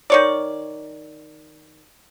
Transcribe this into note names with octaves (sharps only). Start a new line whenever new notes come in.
D#3 C#5 D5